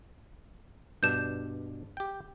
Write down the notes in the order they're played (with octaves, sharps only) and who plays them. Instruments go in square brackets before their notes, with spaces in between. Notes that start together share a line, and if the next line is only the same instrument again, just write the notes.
[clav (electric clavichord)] G2 B2 D4 [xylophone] G6 E7
[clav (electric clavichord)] G4 G5